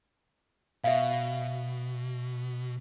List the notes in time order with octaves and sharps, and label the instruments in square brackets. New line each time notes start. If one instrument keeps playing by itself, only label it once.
[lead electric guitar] B2 [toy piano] E5 F5